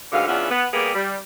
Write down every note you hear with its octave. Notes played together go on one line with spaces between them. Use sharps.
D2 G#2 B2 D3 F5
E2 B3 C#4 D4 F4 E5
B3
G3 A#3 B3 G4 G#4
G3